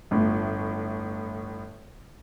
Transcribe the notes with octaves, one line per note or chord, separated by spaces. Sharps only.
G1 A2